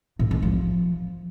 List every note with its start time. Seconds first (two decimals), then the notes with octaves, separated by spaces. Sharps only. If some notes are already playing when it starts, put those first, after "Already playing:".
0.19 A2
0.31 G#3
0.42 F3